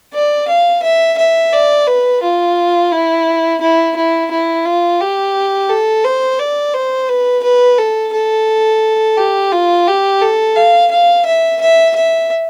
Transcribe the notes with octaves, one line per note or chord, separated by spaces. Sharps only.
D5
F5
E5
E5
D5
B4
F4
E4
E4
E4
E4
F4
G4
A4
C5
D5
C5
B4
B4
A4
A4
G4
F4
G4
A4
F5
F5
E5
E5
E5